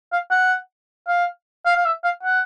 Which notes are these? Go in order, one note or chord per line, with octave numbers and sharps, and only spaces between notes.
F5
F#5
F5
F5
F5
E5
F5
F#5